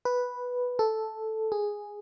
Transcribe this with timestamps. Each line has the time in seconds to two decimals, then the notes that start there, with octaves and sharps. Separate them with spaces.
0.05 B4
0.79 A4
1.52 G#4